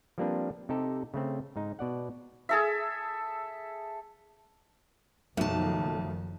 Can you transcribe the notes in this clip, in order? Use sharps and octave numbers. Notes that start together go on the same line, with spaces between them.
F3 G3 A#3 C4 D4 B4
C3 D#4 G4 A4
C#3 A3 C4
G#2 D#4
B2 D5 F#5
G#4 A4 E5
F#1 B1 D#3 F3 A3 A5